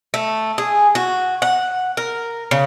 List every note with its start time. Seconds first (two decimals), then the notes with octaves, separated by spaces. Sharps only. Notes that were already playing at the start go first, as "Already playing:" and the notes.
0.14 A3
0.58 G#4
0.95 F#4
1.42 F#5
1.97 A#4
2.51 C#3